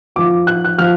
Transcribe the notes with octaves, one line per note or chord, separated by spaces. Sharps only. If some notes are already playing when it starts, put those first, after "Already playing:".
F2 F3 D6
F#6
F#6
F3 F6